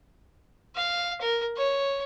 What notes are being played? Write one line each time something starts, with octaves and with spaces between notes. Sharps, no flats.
F5
A#4
C#5